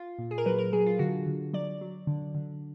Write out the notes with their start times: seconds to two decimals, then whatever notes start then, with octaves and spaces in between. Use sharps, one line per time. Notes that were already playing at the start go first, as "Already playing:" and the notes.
Already playing: F4
0.19 A#2
0.31 G#4
0.38 A#4
0.46 F#3 B4
0.59 A#4
0.73 F#3 G#4
0.86 F4
0.99 D3 F#4
1.27 D3
1.53 F#3 D5
1.81 F#3
2.07 D3
2.35 D3